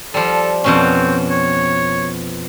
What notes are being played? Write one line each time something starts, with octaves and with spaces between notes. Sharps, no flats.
F3 G3 A4
F2 B2 C4 C#4
C#5